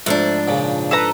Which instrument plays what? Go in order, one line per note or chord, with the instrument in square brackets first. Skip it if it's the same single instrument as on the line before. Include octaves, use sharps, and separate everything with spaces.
[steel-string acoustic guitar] G#2 F3 D4 [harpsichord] A3
[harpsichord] A#2 C#3
[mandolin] A4 B4 A#5